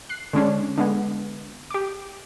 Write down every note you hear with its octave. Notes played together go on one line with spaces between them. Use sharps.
F#6 C7
D3 G#3 C#4 D4
D3 G#3 B3
G4 D6